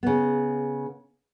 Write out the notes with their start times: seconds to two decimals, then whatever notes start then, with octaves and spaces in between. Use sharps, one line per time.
0.03 C#3 B3